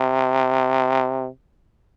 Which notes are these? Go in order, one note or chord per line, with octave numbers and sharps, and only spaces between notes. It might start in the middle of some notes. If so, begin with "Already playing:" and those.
Already playing: C3